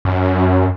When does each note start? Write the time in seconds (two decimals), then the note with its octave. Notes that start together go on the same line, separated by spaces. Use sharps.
0.05 F#2